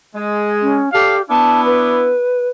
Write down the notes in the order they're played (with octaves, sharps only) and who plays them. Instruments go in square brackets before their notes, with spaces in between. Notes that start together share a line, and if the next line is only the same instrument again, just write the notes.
[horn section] G#3
[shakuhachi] C#4
[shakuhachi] G4 [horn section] A4 D5 F5
[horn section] B3 D4 E4 [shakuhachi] A5
[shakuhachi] B4